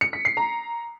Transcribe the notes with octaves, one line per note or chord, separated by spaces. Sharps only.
C#7
B6
C7
A#5